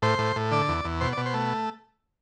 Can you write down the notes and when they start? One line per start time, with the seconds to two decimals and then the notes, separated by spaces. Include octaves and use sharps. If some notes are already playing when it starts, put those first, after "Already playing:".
0.02 A2 C5
0.19 A2
0.36 A2
0.51 D3 D5
0.69 E2
0.85 E2
1.01 B2 C5
1.13 D5
1.17 B2
1.26 C5
1.34 A3